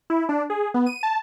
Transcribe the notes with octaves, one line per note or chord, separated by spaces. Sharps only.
E4
D4
G#4
B3
D#7
A5